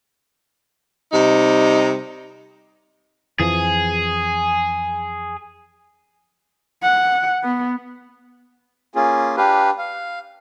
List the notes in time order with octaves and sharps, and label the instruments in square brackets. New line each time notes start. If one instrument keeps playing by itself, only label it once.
[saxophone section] C3 G3 D#4
[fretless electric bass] F2 E3 F3 [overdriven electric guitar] G#4
[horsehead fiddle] F#5
B3
[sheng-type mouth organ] A#3 C#4 F4 G#4
D4 G4 B4 F5
F5